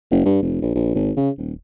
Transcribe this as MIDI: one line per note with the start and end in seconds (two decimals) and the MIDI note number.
0.11 0.25 30
0.25 0.41 43
0.42 0.62 29
0.62 0.70 34
0.75 0.94 34
0.95 1.12 32
1.17 1.30 49
1.38 1.53 27